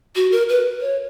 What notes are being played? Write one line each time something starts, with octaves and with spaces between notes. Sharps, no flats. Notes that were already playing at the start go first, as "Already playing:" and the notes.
F#4
A#4
B4
C#5